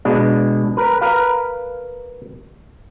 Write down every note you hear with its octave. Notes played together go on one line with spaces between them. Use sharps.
B2 G#3 D4
A#4 B4
A#4 B4 F5